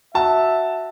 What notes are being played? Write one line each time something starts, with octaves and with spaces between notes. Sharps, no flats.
F#4 E5 A5